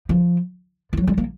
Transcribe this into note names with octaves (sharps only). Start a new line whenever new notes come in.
F3
F3
F#3
G#3
A#3